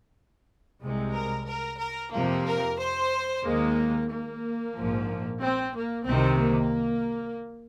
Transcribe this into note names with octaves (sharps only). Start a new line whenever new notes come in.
C2 C3 G#3
A#4
A#4
A#4
F2 C3 F3 A#3
A#4
C5
D#2 D#3 G#3 A#3
A#3
A#1 G#2 F3
C4
A#3
C2 C3 D#3 C4
A#3